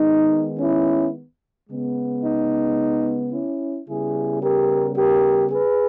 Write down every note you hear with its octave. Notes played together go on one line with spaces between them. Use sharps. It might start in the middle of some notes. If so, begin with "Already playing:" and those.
Already playing: D#3 G#3 B3 D#4
C#4 E4
C#3 G#3 B3
D#4
C#4 E4
C#3 G3 B3 E4 G#4
G4 A#4
G4 A#4
G#4 B4